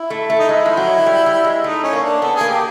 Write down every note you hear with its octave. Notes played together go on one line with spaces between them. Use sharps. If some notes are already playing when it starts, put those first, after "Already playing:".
Already playing: E4
A3
A3
D#4
G#3 E4
F3
F#3
G3
G3
G#3
A3 D#4
C#4
A#3
D4
B3 A4
A#3 G#4
G4